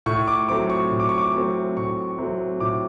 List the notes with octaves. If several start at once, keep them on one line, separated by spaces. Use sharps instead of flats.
A2 C#6
D6
F#3 A3 C4 D6
C#6
A2
D6
C#6
D6
F#3 A3 C4
A2 C#6
F#3 A3 C4
A2 D6